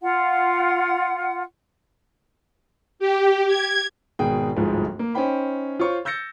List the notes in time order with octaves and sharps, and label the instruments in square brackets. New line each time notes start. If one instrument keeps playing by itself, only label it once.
[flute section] F4 F#5
[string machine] G4
G#6
[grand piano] G#1 B2 G#4 G5
D1 G1 G#2 F3 G#3
A#3
C#4 D#4 C5 G5 B5
F4 C5 C#5 C#6
E6 G6 A6 A#6 C#7